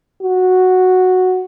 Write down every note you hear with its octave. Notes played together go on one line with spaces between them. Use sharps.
F#4